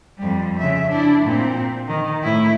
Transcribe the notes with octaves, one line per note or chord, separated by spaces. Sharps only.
F2 G3
C#3 E5
D4 E4
A#2 C4
D#3
A2 E4